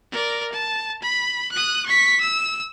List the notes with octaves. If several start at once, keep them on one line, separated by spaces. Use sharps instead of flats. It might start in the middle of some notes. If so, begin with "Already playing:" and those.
A#4 D5
A5
B5
D#6 F#6
C#6 B6
E6